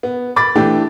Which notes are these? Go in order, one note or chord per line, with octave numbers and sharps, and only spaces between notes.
B3
B5 D6 A6
E3 A3 D4 E4 G4